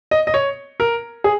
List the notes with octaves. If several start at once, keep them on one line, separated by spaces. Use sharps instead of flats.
D#5
D#5
C#5
A#4
G#4